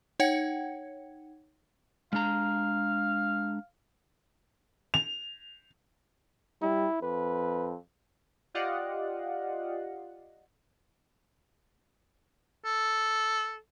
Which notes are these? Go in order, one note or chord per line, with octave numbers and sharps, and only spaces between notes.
D#4 C#5 F#5 G5 G#6 C#7
G#3 D4 F5 A#5
F7
G3 E4
F2 B4
F4 G4 D5 D#5 F5 F#5
A4